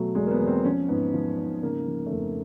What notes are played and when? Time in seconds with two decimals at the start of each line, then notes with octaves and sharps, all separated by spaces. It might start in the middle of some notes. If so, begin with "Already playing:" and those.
Already playing: B2 F#3 A3
0.15 E2 G#3
0.27 A#3
0.31 B3
0.39 E2
0.47 C4
0.64 F3 C#4
0.88 G#2 B3
1.13 F3
1.38 G#2
1.62 C#3 A#3
1.87 F3
2.06 A3
2.11 F2 A#3